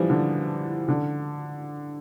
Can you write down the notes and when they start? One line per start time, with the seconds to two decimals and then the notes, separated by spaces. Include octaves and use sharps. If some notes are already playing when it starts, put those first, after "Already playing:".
Already playing: E3 F3 G3
0.10 D3
0.88 D3